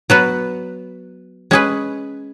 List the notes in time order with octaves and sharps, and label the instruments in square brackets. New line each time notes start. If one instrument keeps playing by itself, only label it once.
[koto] F#3 B3 F#4 B4
G#3 C#4 G#4 B4